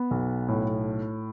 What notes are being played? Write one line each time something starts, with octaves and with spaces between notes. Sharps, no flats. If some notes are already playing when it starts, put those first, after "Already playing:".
Already playing: B3
B1
A2